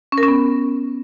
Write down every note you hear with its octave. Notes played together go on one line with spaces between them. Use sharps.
C#4
A#4
C#4
B3